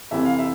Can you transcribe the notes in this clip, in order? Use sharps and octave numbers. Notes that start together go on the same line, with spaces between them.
F1 F2 C3 E3 E5
F5
E5